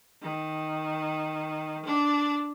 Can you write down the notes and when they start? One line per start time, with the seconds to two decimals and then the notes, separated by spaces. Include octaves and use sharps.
0.22 D#3
1.85 D4